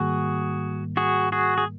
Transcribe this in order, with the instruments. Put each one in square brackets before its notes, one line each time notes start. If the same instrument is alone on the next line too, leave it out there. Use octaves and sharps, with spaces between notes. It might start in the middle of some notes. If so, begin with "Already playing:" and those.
Already playing: [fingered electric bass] G#2 D#3 G3 A#3 [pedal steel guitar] F#4 G#4
[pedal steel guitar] F#4 G#4
F#4 G#4
G#4